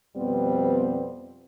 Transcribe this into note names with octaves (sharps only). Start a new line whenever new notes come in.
F2 B2 G3 B3 C4